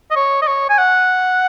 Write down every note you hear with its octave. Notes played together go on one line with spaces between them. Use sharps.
D#5
C#5
D#5
C#5
G#5
F#5